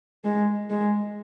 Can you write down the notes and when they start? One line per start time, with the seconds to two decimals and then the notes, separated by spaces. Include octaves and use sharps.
0.25 G#3
0.70 G#3